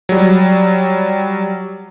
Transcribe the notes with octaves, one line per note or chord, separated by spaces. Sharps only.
F#3 G3